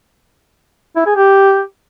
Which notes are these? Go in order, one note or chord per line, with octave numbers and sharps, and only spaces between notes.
E4
G#4
G4